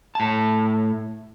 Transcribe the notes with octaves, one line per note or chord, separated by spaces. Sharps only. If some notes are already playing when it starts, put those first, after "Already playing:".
A2 A5